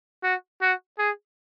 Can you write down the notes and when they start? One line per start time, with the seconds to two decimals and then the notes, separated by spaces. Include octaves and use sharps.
0.23 F#4
0.61 F#4
0.99 G#4